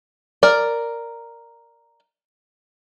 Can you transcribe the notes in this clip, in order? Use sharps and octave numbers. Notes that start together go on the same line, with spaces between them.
A#4 D5